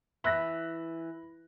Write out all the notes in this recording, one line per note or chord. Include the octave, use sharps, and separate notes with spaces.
E3 E5 B5 F#6 A#6